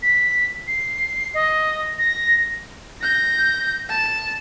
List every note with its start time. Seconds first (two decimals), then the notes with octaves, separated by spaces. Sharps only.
0.03 B6
0.67 C7
1.34 D#5
1.99 A#6
3.01 G6 A#6
3.89 A5